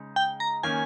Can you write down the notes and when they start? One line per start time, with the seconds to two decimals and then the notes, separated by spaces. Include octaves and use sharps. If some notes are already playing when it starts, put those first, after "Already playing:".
Already playing: C#3 G#3 D#4
0.16 G5
0.40 A#5
0.63 D#3 A#3 C#4 G#5